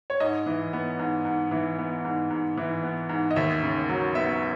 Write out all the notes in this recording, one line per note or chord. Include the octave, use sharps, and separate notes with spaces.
C#5
G#2 D#5
E3
B3
G#2
G#2
E3
B3
G#2
G#2
E3
B3
G#2
D#5
D#2 E5
C#3
F#3
B3 E5